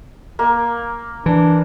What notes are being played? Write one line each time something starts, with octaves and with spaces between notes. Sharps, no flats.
A#3
E3 D4